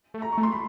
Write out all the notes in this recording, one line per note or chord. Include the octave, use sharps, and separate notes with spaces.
A3
A#5
C#6
A3
C6
B5